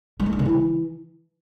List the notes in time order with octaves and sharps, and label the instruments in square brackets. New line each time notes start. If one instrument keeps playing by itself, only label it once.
[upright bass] G3
A3
D4
D3
E3